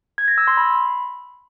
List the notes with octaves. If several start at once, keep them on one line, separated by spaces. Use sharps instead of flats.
G#6
A#6
E6
C6
B5